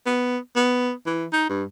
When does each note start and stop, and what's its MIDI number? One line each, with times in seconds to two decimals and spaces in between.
0.06 0.38 59
0.56 0.92 59
1.06 1.26 52
1.33 1.46 63
1.50 1.64 43